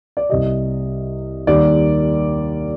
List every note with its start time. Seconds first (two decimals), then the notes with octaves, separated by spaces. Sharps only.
0.17 D5
0.29 C2 C3 G3 D#5
1.47 D#2 D#3 G3 D5